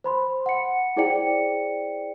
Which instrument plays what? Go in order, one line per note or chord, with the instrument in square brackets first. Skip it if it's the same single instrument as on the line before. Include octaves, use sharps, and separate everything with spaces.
[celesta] C5 B5 C6
F#5 C#7
E4 G#4 C5 D5 G5 C#7